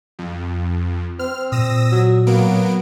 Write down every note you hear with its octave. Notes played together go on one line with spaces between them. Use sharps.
F2
C4 F6
A#2 D#6 E6 A#6
F#3
F#3 A#3 B3 D7